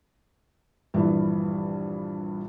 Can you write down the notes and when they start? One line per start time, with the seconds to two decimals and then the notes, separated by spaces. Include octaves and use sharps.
0.94 A#1 G2 E3